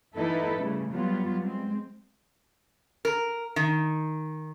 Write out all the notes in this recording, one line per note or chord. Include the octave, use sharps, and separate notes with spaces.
E3 A#3 D#4 E4 A4 B4
C#3 G3 A3
F#3 G3 B3 F4
G#3 C4
A#4
D#3